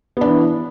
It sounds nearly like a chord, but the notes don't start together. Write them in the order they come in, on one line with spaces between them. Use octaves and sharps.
B3 D4 E3